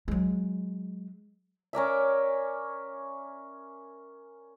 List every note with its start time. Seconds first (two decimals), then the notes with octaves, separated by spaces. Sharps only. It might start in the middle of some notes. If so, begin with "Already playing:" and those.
0.08 F#3 G#3
1.73 C#4 A#4 D5 E5